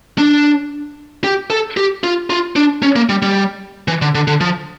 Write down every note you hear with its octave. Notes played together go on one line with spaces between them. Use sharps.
D4
G4
A4
G4
F4
F4
D4
C#4
A#3
G3
G3
E3
D3
D3
D3
F3